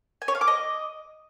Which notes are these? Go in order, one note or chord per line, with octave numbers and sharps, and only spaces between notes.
G#5
C#5
F5
D6
D#5